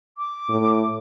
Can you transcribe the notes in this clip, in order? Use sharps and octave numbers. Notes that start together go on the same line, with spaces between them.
D6
A2